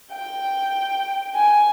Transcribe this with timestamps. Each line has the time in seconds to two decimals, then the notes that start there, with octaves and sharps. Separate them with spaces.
0.12 G5
1.35 G#5